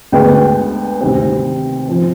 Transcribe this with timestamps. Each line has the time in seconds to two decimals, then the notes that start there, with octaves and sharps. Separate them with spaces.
0.12 D2 D3 G#3 B3 G5
1.01 D2 C3 D#3 G3 C4
1.89 F3 C4